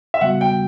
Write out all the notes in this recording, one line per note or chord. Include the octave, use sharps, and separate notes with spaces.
E5
C#3 G3 B3 F#4 F#5
G5